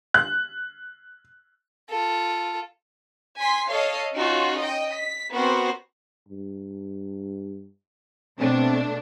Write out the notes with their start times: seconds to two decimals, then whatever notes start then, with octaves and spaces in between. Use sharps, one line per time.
0.14 F#6
1.90 F4 A4
3.39 G#5 C6 B6
3.69 A4 C#5 D#5 F5
4.15 C#4 D#4 F4 F#4
4.59 D#5 G5
4.92 B6
5.35 B3 C4 F#4 A#4 C5
6.29 G2
8.39 B2 A3 C4 D4